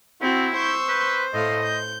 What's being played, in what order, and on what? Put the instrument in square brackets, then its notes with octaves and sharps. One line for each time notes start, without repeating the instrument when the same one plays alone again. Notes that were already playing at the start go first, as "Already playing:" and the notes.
[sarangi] C4 [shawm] E4 [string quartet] F#4
[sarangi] C5 [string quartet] C#6 E6 G6
[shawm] B4
[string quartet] A2 A3 F5 [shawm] D#5
[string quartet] G6